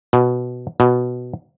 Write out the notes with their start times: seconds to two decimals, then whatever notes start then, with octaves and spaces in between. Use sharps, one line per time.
0.13 B2
0.80 B2